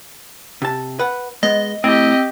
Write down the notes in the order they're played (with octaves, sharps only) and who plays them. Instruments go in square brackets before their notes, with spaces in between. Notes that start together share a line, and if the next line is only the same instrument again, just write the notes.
[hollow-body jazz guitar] C3 A5
B4 F#5
[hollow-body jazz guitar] G#3 B3 [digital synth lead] D#5
[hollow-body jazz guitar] A2 [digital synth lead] C4 [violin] G4 D#5